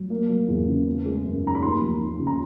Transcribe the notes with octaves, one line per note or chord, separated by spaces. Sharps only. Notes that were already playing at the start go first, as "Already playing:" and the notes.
Already playing: F#3
A#3
F#3
E2
C#3
B3
G#3
F#2
D#3 A#5
B5
D#2 C6
F3
D#2
C#3
A#5